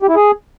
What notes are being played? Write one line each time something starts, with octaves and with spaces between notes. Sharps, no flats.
G4
E4
G#4